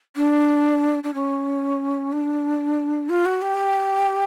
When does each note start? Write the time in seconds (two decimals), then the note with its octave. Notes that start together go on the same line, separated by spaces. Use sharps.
0.16 D4
1.03 D4
1.14 C#4
2.12 D4
3.09 F4
3.25 F#4
3.42 G4